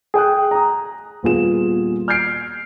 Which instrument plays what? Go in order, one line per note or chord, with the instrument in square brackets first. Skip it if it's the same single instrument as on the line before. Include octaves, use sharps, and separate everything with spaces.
[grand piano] G#4 G5 D#6 F#6
A#5 D#6
D#1 B3 F4 G#4 E7
F6 G6 G#6 C7 D7